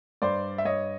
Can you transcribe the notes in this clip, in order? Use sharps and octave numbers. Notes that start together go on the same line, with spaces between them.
G2 C5 D5
E5
G2 C#5 D#5